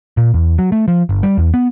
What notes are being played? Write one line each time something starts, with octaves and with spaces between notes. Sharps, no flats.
A#2
E2
F#3
A3
F3
G1
G3
E2
B3